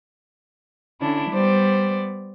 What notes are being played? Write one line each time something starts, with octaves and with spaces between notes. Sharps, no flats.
D3 C#4 D4 E4
G3 B3 C5 D5